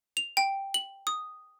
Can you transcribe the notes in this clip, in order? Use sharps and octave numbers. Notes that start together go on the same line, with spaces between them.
F7
G5
F#7
D#6